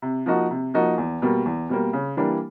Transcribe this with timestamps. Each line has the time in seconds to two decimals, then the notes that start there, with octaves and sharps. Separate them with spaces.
0.02 C3
0.26 F3 A#3 D#4 F#4
0.51 C3
0.74 F3 A#3 D#4 F#4
0.98 E2
1.22 B2 G3 A#3
1.45 E2
1.69 B2 G3 A#3
1.93 C#3
2.17 E3 G3 A#3 D4